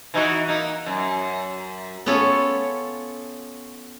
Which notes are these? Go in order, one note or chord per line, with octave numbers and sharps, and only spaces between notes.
E3 D#4 F#4
A#3 D#4
F#2
B3 C#4 F4 A4 C#5